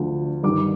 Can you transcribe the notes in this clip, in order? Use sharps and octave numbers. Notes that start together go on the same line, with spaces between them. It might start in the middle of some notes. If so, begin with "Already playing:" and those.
Already playing: D2 D3 F3
G2 D#3 D6